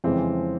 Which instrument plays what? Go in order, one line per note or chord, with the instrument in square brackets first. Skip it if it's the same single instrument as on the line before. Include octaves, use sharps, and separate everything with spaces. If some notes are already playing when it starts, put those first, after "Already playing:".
[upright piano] F2 C#3 E3 G#3 C4